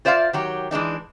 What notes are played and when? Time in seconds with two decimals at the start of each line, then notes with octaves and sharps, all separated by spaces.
0.05 F4 C5 D5 E5 F5
0.33 D#3 F#3 G4
0.71 E3 G#3 D4 D#4